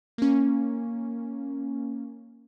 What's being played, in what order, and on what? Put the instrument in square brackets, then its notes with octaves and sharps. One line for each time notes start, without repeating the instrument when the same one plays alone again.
[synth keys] A#3 C#4